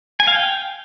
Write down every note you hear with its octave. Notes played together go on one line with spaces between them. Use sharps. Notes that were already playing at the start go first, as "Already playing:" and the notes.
G#5
F5
G5